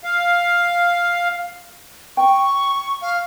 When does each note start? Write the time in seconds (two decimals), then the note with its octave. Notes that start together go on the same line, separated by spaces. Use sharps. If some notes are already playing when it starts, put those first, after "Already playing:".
0.04 F5
2.17 G5 C#6
3.01 F5